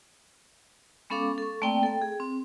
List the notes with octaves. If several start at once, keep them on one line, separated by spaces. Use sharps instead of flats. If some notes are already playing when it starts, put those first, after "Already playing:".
G#3 B3 C#4 A4 F5 D6
A4 C#6
A3 A#3 C4 D5 G5 A5
A4 G5
G#4
C4